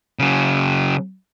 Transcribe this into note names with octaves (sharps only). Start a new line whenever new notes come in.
C#3 F#3